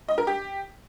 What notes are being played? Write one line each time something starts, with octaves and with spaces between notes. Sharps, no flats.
D#5
A#4
G4